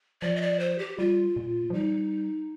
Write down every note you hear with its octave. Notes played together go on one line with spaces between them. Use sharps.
F3 D5
D#5
D5
C5
G4
G3 F4
A#2
F3
G3 D#4